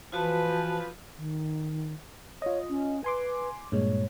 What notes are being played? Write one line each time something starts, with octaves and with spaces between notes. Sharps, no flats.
E3 F3 F4 F#4 B4 A5
D#3
F4 C#5 D#5
C#4
B4 G#5 C6 D6
G2 A#2 G#3 C#5